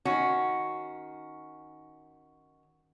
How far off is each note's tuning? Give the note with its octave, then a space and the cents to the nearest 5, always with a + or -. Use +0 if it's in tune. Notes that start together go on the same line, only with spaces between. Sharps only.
D#3 +0 C#4 +0 F#4 +0